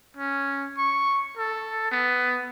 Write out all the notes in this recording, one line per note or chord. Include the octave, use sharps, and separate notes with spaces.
C#4
C#6
A4
B3